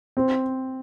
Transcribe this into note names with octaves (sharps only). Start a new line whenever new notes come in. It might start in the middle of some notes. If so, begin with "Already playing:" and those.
C4